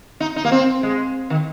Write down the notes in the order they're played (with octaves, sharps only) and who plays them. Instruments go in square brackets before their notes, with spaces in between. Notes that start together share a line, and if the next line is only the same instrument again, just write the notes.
[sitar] D#4
D#4
A#3
C4
G#3
D#3